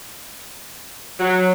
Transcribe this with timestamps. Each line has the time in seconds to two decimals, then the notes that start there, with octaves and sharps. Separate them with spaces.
1.19 F#3